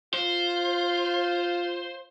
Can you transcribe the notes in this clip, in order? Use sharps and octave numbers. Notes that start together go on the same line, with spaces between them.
F4 C5